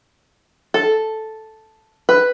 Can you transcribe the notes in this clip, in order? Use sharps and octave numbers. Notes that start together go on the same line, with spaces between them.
A4
B4